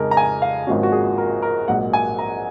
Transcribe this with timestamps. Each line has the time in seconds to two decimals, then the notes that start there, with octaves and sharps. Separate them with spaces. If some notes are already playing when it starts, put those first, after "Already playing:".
Already playing: F2 C#3 G#3 D#4 A#4
0.11 A#5
0.17 G#5
0.42 F5
0.67 G#1 G#2 F3 A#3 C#4 F#4
0.83 F#4
0.92 G#4
1.18 A#4
1.42 A#4
1.68 A#1 G#2 F#3 A#3 F#5
1.93 G#5
2.19 A#5